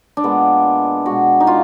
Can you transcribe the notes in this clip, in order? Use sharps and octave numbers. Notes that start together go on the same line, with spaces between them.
D4
A#2 G#3 B3
B2 G#3 F#4
D#4
F4